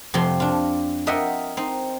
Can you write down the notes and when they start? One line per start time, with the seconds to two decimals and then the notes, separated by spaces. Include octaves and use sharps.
0.14 F2 C3 G3 C4 C6
0.40 D4 F4
1.06 F4 A#4 D#5 E5 F#5 G5
1.57 C4 D#4